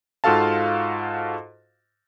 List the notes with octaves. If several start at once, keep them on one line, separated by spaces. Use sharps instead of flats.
G#2 F4 F#4 A4 F5 A5